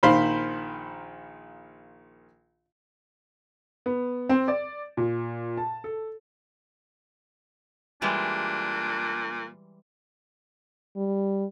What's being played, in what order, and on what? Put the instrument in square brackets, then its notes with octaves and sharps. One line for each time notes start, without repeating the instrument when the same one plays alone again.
[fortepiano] A#1 D#3 C5 F5 B5 C6
[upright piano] B3
C4
D5
A#2
A5
A4
[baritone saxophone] A#2 [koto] E3 G3 G#3 [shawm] D4
[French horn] G3